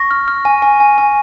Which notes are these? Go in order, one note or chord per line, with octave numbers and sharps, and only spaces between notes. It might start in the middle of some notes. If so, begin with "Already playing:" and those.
Already playing: C#6 A#6
F6
F6
G#5
G#5
G#5
G#5